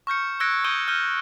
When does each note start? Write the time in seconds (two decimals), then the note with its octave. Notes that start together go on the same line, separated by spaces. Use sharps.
0.07 C#6 F6 G6 C#7
0.40 E6 F#6 G#6 A#6 C#7 D7
0.65 C#6 D#6 G6 D7 D#7 G7
0.88 F6 G6 D#7 G7